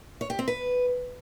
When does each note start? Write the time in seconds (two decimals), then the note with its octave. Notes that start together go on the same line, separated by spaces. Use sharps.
0.21 C#5
0.30 G4
0.39 C4
0.48 B4